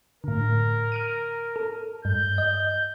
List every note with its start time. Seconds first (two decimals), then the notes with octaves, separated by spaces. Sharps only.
0.24 A2 D3 A#4
0.92 F6 D7 D#7
1.56 A4
2.05 G2 G6
2.38 D#5